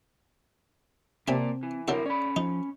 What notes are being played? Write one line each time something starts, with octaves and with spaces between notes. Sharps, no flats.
C3 A#3 C4 D5 G#5 A5 B5
E3
D3 F#3 C4 E4 A4 A#4
C#4 D5 B5
F3 D#4